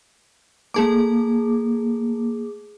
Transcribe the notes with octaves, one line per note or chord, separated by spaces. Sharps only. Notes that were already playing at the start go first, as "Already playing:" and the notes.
A3 A#3 G#4 D6